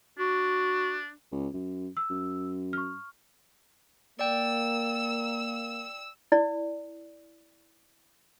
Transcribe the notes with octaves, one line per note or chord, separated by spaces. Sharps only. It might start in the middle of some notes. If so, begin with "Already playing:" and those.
D4 F#4
C#2
F#2
E6
F#2
C#6 F6
A#3 D5 G5 E6
E4 D5